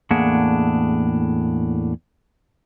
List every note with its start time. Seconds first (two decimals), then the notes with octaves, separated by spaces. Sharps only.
0.11 E2 A2 A#3 D4 G#4 F#5